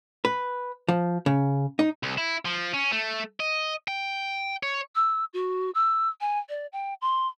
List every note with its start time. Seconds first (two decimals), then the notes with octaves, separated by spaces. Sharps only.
0.25 B4
0.89 F3
1.26 C#3
1.79 D#4
2.03 C2
2.18 E4
2.45 F3
2.74 C#4
2.92 A3
3.40 D#5
3.88 G5
4.63 C#5
4.96 E6
5.34 F#4
5.75 E6
6.21 G#5
6.49 D5
6.73 G5
7.02 C6